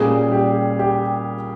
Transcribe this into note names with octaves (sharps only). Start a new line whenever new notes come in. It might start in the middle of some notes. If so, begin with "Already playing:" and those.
Already playing: A#2 G3 C#4 G#4
G4
G4